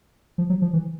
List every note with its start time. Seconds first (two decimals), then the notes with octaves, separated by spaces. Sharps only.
0.38 F3
0.50 F#3
0.62 F3
0.73 E3